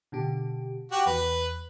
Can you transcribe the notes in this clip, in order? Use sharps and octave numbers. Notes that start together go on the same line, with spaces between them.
B2 D3 G4
F#4 G4
E2 B4